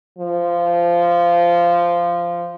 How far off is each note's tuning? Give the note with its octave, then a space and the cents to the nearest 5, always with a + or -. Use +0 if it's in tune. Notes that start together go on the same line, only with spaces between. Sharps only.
F3 -15